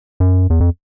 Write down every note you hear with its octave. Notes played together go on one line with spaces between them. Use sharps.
F#2
E2
F2